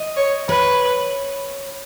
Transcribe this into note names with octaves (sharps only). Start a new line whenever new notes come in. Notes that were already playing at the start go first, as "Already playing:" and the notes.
Already playing: D#5
C#5
B4 C#5